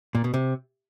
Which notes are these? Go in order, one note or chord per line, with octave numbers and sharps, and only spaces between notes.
A#2
B2
C3